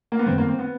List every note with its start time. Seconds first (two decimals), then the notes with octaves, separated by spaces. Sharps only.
0.12 A#3
0.19 B3
0.26 F#2 D#3 G3 C4
0.38 A#3
0.48 C4
0.59 B3